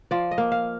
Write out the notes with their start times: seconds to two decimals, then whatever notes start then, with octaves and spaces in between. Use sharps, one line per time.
0.11 F3 D5
0.31 D#5
0.38 A#3
0.52 F5